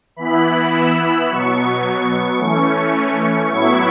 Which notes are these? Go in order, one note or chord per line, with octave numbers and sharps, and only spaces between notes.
E3 B3 E4 B5
E6
B2 F#3 B3 C#6
E3 A3 C#4
A2 F#3 B3 E4 C#6